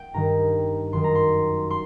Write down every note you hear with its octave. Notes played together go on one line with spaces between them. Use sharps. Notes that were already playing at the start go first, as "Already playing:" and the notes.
Already playing: G5
G2 D#3 A#5
F#2 D#3 C6
A#5
C6
C6